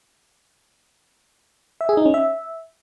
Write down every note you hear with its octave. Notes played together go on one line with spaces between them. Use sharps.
E5
G#4
D#4
C#4
E5